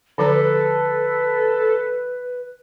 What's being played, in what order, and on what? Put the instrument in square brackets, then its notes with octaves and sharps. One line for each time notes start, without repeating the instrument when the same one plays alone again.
[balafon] D3 F3 A#5 [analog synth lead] A4 [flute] B4